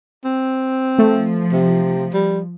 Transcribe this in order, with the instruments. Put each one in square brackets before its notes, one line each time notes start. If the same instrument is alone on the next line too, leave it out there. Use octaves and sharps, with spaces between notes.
[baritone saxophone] C4
[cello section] F3 [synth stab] A3
[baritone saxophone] C3
G3